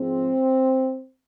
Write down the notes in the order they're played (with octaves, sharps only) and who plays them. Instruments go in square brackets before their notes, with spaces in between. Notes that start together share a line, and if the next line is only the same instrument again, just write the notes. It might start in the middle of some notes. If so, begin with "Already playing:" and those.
Already playing: [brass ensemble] G#2 F3 G#3 C4